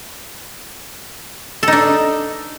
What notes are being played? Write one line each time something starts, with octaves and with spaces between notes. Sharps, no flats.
D4 D#4 A4